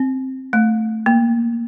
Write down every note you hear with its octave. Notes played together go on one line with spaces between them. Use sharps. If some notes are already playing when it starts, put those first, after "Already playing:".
Already playing: C4
A3
A#3